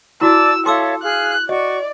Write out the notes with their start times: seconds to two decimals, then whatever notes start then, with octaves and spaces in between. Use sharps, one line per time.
0.21 E4 F#4 D5 A5 D6 E6
0.66 A4 C#5 E5 F5 C6 D6 E6
1.03 G#4 F5 F6 F#6
1.49 F#4 D5 D#5 C#6